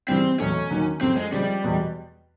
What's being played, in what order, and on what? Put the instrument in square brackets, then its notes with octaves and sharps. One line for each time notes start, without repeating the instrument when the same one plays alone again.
[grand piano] C#3 E3 G3 [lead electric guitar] C4
[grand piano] E2 B2 F#3 A3 [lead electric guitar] C#4
[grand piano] D#2 D#3 F#3
[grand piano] F#2 C#3 F3 A3 [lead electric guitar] C4
[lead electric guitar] G#3
[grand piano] C#3 F3 G#3 C4 F4 [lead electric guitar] G3
[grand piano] E2 B2 G#3